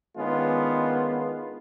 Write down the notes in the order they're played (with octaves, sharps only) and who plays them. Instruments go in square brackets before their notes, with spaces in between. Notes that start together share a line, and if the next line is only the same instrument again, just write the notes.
[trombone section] D#3 G#3 B3 C#4 D4 F4